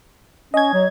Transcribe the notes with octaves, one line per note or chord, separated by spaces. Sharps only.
C#4 D#5 G#6
F#3